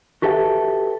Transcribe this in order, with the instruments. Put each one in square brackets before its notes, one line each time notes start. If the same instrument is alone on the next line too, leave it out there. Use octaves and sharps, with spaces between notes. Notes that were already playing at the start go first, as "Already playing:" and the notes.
[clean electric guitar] F#4 G4 A4 B4 E5 G5